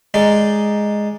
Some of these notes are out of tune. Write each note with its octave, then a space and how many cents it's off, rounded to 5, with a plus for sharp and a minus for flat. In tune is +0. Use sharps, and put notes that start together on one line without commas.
G#3 +0 D#4 +0 D5 +5